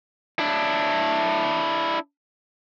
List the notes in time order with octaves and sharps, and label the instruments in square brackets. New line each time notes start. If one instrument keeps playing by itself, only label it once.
[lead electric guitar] D4 E4